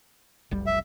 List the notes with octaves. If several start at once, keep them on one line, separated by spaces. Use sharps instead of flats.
F1 B1 G3
E5